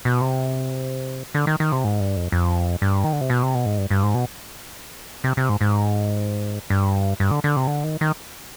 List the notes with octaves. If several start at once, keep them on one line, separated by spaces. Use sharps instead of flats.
B2
C3
D3
D#3
D#3
C3
G#2
G2
F2
F2
G2
D#3
D3
C3
B2
C3
B2
G#2
G2
G2
G#2
B2
C3
C3
G#2
G#2
G2
G2
D3
D3
C3
D3
D#3
D#3